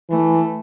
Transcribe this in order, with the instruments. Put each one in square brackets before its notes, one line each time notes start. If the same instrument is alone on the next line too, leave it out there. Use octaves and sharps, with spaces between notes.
[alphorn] E3 [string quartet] A3